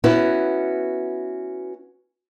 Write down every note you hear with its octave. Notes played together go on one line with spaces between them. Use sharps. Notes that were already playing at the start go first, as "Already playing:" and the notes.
B3 C#4 E4 F#4 B4